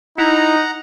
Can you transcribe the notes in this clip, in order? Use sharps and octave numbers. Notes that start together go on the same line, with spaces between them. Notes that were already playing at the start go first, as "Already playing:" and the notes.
D#4 E4 F#5 A#5